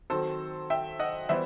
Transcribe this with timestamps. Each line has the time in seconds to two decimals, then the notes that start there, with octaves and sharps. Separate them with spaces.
0.10 D#3 F#3 C4 A4 C5
0.70 E5 G5
0.99 D#5 F#5
1.29 E3 G3 B3 E4 C5 E5